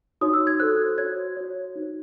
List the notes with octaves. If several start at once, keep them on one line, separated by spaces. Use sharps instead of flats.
D#4 F#4 C#5 D#6
E6
G#6
F#4 A4 C5 F#6
F#4 C#5 G#6
F#4 C#5
D#4 F#4 C5